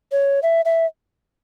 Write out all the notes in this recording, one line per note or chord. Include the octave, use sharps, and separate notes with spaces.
C#5
E5
E5